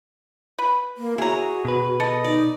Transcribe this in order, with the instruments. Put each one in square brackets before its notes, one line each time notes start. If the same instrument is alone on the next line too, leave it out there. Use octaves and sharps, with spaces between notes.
[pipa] B4
[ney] A#3
[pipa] E4 A#5 [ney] F#4 [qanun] G#4 C#5
[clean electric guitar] B2 B4
[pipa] A4 [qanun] D#5
[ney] D#4 [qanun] D5